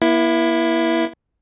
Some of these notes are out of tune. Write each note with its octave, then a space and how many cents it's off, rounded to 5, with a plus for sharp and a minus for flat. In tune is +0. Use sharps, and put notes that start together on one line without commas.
A#3 +45 E4 +5